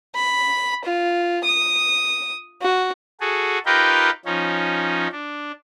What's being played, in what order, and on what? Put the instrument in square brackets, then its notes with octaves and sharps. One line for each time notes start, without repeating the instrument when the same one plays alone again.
[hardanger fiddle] B5
F4
D#6
F#4
[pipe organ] F#4 G#4 A4
D#4 F4 G4 A#4 B4 G5
F3 C#4 D#4
D4